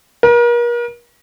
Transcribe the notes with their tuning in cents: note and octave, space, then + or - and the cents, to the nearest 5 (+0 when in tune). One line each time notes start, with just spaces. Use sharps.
A#4 +40